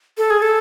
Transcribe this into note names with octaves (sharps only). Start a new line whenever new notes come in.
A4
G#4
A4